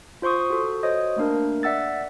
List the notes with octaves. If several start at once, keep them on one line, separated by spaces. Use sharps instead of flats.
F4 C5 C6 C#6 D#6
F#4 A4
F#4 C5 C#5 D#5 D#6
A3 A#3 D4 A#4
D5 E5 F#5 E6 A6